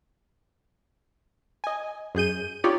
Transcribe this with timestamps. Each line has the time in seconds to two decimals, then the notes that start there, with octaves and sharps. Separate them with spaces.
1.64 D#5 G#5
2.15 F#2 G#4 G6 D#7
2.64 D#4 F4 G4 C#5 D5